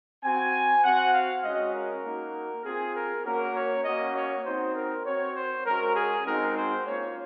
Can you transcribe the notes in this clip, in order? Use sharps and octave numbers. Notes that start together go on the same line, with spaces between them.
C4 F#4 G#5
C4 F#4 F#5
F5
G#3 C#4 F#4 D#5
A#4
A#3 D#4 F#4
C4 F4 G#4
A#4
A#3 C#4 F#4 A#4
C#5
A#3 C#4 F#4 D#5
C#5
C4 D#4 F#4 C5
A#4
C4 F#4 C#5
C5
G#3 C#4 F#4 A#4
G#4
G#3 C4 D#4 F#4 A#4
C5
A#3 C#4 F4 C#5